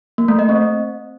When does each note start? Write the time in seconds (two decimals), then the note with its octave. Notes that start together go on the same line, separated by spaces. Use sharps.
0.18 A#3
0.28 A3
0.39 D#5
0.49 C4